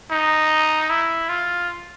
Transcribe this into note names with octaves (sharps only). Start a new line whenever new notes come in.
D#4
E4
F4